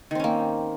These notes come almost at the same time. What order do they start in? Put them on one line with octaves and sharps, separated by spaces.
D#3 C4 C#4 A#3